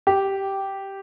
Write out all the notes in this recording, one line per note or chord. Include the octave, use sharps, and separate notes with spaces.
G4